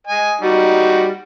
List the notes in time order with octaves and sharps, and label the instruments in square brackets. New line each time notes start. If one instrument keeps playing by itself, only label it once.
[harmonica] D#5 G#5
G3 D#4 F#4